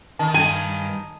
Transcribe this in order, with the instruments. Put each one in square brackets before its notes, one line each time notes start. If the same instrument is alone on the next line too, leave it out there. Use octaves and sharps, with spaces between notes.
[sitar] D#3 [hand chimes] A5
[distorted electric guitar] G2 [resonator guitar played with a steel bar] G#5